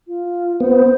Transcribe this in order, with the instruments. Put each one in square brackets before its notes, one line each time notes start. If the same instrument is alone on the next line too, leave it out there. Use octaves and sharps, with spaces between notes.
[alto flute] F4
[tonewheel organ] B3 [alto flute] C5